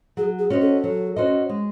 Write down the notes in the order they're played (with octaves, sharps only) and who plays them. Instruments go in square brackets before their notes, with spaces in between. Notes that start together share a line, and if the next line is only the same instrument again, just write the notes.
[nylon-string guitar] F#3 [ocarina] G#4
[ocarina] G#4
[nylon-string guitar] C#4 F#4 C5 D#5
[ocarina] A4
[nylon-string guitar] F#3
C#4 F#4 C5 D#5
G#3